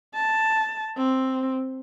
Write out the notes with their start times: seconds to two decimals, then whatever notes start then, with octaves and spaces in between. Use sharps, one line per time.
0.14 A5
0.97 C4